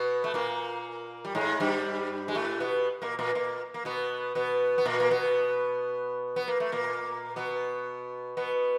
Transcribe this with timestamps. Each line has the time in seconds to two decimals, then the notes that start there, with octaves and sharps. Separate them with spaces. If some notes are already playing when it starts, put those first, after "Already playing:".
Already playing: B2 B3
0.24 A3
0.34 A#2 A#3
1.25 G3
1.35 G#2 G#3
1.60 G2 G3
2.28 G#3
2.35 A2 A3
2.60 B2 B3
3.02 A#2 A#3
3.19 A#2 A#3
3.35 A#2 A#3
3.74 A#3
3.85 B2 B3
4.35 B2 B3
4.78 B3
4.86 A#2 A#3
5.00 A#3
5.11 B2 B3
6.36 B3
6.48 A#3
6.60 A3
6.72 A#2 A#3
7.36 B2 B3
8.37 B2 B3